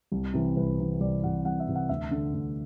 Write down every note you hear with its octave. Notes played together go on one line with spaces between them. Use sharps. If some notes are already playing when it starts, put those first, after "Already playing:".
C2
C3 E3
C2 B4
C3 E3
C2 D5
C3 E3 F#5
C2 F#5
E5
C3 E3
F#5
D2 E5
D3
D2